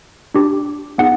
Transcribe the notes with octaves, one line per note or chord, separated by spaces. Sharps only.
D4 G4
B3 D#4 G#4 F#5